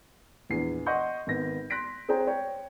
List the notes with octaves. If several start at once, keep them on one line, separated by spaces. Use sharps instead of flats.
A#1 E2 C7
D#5 F#5 C6 C#6 G6
G#1 B3 A#6
C6 F#6 A#6 B6 D7
C4 G#4 C5 C#5 G5 A#5
C#5 G5